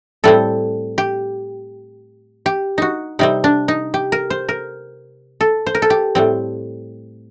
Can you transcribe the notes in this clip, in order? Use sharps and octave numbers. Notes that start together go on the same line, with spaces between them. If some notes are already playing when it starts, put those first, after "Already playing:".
A2 G3 C4 A4
G4
G4
D#4 F#4
C3 G3 C4 D#4
D4
D#4
G4
A#4
C5
A#4
A4
C5
A#4
A4
G4
A2 G3 C4